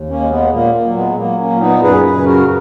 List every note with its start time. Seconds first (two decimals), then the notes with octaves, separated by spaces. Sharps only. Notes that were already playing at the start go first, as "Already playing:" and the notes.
Already playing: D#2
0.09 A#3 C#4
0.20 G#3
0.31 G#3 B3
0.53 A#2 A#3
0.75 A#3
0.85 F#3
0.96 G#3 B3
1.18 F#3 A#3
1.39 A#3 C#4
1.50 A#2
1.61 B3 D#4
1.83 F#2 G#4 B4
2.04 G#4 B4
2.16 C#3
2.26 F#4 A#4